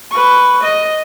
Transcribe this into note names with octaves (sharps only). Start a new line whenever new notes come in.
B4 C#6
D#5